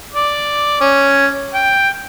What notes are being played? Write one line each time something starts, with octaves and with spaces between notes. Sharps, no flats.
D5
C#4
G5